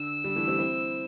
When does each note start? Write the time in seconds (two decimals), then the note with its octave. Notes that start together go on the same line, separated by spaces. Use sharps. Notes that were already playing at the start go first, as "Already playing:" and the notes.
Already playing: D3 E6
0.24 D3 G3
0.36 E3 A3
0.48 G3 C4
0.59 C4 E4